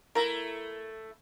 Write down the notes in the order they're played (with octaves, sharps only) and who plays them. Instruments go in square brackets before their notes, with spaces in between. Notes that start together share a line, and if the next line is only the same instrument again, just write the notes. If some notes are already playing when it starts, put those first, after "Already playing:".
[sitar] A3 E4 [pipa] A#4 A#5